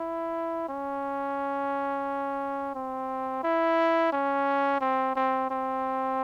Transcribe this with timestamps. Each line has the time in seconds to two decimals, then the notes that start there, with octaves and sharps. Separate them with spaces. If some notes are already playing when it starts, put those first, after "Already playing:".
Already playing: E4
0.69 C#4
2.75 C4
3.43 E4
4.13 C#4
4.81 C4
5.16 C4
5.50 C4